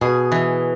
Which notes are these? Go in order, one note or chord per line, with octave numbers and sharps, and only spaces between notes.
B2 G#4
E3